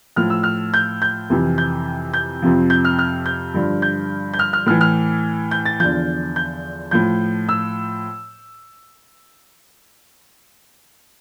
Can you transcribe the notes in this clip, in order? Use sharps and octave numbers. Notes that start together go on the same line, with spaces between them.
A2 F3 F6
E6
F6
G6
G6
F2 C3 E3
G6
G6
F2 C3 F3
G6
F6
F6
G6
G2 D3 F3
G6
G6
F6
F6
A2 E3 F6
F6
G6
A6
E2 D3 F3 G6
G6
A2 F3 G6
E6